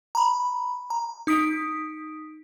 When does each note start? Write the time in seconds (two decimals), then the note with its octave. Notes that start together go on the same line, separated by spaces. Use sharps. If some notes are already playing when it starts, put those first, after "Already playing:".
0.15 A#5 B5
0.90 A#5
1.27 D#4 D#6 B6 D7